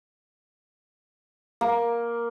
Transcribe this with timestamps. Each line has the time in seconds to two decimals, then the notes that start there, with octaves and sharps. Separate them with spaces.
1.61 A#3